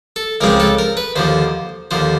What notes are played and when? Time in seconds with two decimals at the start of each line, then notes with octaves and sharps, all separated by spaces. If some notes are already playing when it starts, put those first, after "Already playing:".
0.16 A4
0.41 C#2 C#3 F3 G#3 C4 A#4
0.60 A4
0.79 A#4
0.97 B4
1.16 D#2 D3 F3 C5
1.91 D#2 D3 F3 C5